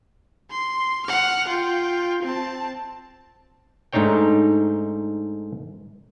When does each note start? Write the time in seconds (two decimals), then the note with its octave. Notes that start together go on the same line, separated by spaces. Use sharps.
0.50 C6
1.06 F#5 F6
1.48 F4 G5
2.23 C4 A5
3.93 G#2 A3 D4 D#4 C#5 G5